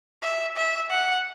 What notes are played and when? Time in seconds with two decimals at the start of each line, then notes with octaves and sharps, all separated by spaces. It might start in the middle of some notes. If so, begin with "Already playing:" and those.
0.22 E5
0.56 E5
0.90 F#5